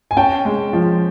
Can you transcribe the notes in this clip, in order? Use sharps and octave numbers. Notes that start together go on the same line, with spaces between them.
G#5
C#4 G5 A5
G#3
F3